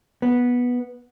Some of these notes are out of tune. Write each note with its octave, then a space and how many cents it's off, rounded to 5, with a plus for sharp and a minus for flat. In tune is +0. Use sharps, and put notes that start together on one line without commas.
B3 -10